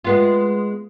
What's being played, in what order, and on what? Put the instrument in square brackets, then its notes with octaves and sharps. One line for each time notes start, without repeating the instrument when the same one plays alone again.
[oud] G#3 B3 F4